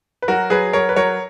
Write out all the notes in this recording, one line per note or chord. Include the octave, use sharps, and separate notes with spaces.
B4
F#3 F#4 A#4
F#3 G#4 B4
F#3 A#4 C#5
B4
F#3 A#4 C#5